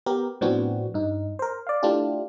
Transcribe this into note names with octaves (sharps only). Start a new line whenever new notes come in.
B3 G4 A#4
A2 F3 B3 C4 D4 F#4
G2 D#4
A#4 C5
D5 F5
A3 D4 E4 F4 G4